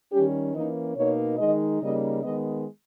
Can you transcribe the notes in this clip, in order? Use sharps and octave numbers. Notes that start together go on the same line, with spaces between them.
D#3 G3 C#4 G4
E3 A#3 C#4 D#4
B2 A#3 D#4 C#5
D#3 G#3 D#4 D#5
C#3 G3 A#3 D#4 D#5
D#3 G#3 B3 D#5